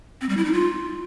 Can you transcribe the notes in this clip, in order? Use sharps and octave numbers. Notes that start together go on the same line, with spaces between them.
C4
G3
E4
D#4
F4